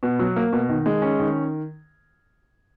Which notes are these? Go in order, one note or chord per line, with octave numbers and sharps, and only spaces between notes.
B2
F#3
A#3
B2
D#3
G#3
C#4
D#3